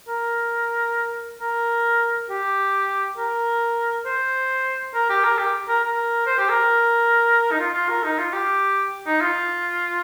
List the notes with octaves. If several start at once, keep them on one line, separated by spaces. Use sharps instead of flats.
A#4
A#4
G4
A#4
C5
A#4
G4
A#4
G4
A#4
A#4
C5
G4
A#4
D#4
F4
F4
A#4
D#4
F4
G4
D#4
F4